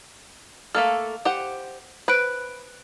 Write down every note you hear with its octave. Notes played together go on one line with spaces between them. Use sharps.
A3 A#3 A4 F5 F6
G4 C5 F#5
B4 C5 F#6 D7